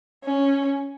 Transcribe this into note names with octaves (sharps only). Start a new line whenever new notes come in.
C#4